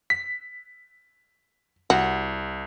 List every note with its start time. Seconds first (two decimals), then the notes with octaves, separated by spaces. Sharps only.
0.10 B6
1.90 C2 F#4